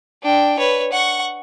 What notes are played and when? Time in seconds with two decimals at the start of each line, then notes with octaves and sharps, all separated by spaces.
0.23 D4 G5
0.59 B4 C#5
0.92 F#5 C#6